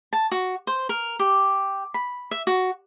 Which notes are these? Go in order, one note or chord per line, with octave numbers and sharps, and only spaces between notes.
A5
F#4
C5
A#4
G4
B5
E5
F#4